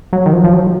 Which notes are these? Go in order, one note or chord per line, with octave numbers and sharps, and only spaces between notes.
F#3
D#3
F3
F3
F#3